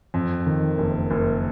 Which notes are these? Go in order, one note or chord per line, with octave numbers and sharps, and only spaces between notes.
F2
D#3
F#1
F#1